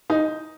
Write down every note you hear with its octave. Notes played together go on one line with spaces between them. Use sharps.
D#4